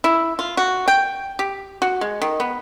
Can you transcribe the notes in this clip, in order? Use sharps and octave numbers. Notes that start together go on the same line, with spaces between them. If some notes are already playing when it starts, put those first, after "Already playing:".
E4
F4
F#4
G5
G4
F#4
G#3
D#3
B3